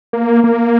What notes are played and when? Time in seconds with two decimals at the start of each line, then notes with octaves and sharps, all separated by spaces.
0.13 A#3
0.44 A#3